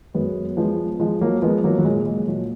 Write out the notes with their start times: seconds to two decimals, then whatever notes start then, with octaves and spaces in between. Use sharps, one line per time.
0.14 F#2 G#3 B3
0.57 F3 G#3 B3
1.00 F3 G#3
1.21 F#3 A#3
1.42 F3 G#3 B3
1.64 F#3 A#3
1.79 F#3
1.84 A#2 G#3
2.06 G#3
2.28 A#2 F#3